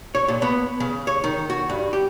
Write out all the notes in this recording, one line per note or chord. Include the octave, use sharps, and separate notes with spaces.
C#5
A#2
B3
C#3
C#5
D#3
F#4
G2
G4